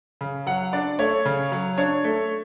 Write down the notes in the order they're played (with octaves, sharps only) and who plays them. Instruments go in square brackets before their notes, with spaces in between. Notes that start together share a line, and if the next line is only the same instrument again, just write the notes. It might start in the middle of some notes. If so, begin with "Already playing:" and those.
[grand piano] C#3
F#3 F#5
D4 D5
A3 C#5
C#3
F#3
D4 C#5
A3